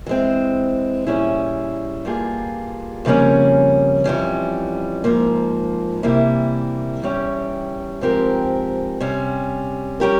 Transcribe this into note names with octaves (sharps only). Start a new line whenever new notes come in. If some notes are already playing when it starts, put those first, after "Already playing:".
E3 G#3 C4
A#2 G3 C#4 E4 G#4
G2 G3 A#3 F4 G#4
F2 C#3 G3 A#3 C#4
F2 E3 G3 C#4
G#2 F3 A#3
C3 E3 G3 A#3 E4
E2 E3 G3 C#4 G4
G#2 F3 C4 G4 A#4
C3 G3 C#4
G3 C#4 G4 A#4